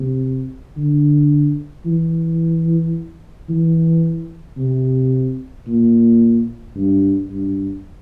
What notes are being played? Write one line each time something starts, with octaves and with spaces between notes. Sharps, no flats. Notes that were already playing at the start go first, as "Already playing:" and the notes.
Already playing: C3
D3
E3
E3
C3
A#2
G2
G2